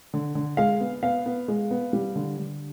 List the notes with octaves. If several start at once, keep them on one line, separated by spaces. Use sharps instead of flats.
D3
D3
G#3 F5
B3
B3 F5
B3
G#3
B3
G3
D3
D3